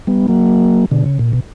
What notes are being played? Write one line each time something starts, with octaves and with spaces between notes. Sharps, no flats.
G3 B3
F#3 A#3
B2 D3
C#3
A#2
B2